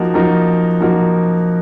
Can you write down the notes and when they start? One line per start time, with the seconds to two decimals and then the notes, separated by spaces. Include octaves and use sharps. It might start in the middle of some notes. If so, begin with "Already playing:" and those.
Already playing: F3 A#3 D#4 F#4 A#4
0.14 F3 A#3 D#4 F#4 A#4
0.80 F3 A#3 D#4 F#4 A#4